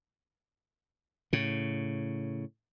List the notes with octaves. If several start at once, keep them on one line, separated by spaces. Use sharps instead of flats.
A2 C#3